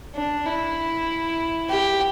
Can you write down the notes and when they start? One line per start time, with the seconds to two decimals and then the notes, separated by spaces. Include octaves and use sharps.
0.16 D4
0.46 E4
1.69 G4